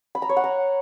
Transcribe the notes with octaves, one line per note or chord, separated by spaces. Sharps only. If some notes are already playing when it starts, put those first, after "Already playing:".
B5
A#5
C#5
F#5
A#5